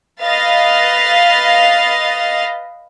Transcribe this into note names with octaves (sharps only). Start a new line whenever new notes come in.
B4 D#5 F5 A6